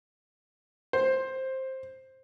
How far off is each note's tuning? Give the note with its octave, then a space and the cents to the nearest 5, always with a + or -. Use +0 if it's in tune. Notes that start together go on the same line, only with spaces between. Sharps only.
C5 +10